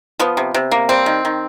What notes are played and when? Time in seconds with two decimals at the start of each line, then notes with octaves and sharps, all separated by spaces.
0.19 F3 B3
0.37 C3
0.54 C3
0.71 A#3
0.89 G3 C4
1.06 D#3
1.25 D#3